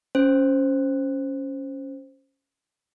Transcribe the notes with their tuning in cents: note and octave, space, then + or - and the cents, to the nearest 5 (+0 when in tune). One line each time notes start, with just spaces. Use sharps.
C#4 +0 C5 +0